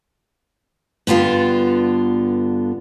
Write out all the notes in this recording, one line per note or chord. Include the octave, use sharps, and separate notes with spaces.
G2 D3 B3 F4 A4